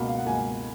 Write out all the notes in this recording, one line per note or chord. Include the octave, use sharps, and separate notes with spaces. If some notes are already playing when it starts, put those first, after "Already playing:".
Already playing: C#2 B2 A#3 B5
F5
F#5
C#2 B2 A#3 G#5